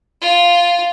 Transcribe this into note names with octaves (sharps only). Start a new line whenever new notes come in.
F4